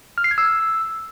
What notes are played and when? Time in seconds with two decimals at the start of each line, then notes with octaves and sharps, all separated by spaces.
0.18 F6
0.24 C7
0.31 G#6
0.38 E6